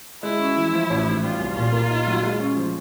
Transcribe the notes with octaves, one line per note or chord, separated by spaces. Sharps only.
G#3 E4
C#4
E3
F3
A1
G#2
G3 F4
C2
A#2
A#3
D#4
F#3
G#3
C#4
F3